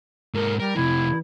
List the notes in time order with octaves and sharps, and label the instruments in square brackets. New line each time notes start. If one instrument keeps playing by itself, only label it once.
[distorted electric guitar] G#2 A4 [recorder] A#4
[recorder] G3 [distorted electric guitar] A#4
[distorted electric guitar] F2 C3 [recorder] E4